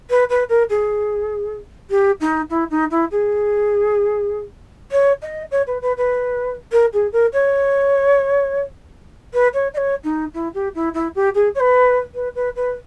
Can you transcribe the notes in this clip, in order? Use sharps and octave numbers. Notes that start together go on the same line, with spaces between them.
B4
B4
A#4
G#4
G4
D#4
E4
D#4
E4
G#4
C#5
D#5
C#5
B4
B4
B4
A#4
G#4
A#4
C#5
B4
C#5
D#5
C#5
D#4
E4
G4
E4
E4
G4
G#4
C#5
B4
B4
B4
B4